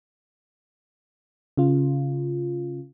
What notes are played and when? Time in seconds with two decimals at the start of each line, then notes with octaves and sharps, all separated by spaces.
1.57 C#3 F4